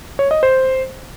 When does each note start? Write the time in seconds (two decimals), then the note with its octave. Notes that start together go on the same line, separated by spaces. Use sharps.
0.19 C#5
0.31 D#5
0.43 C5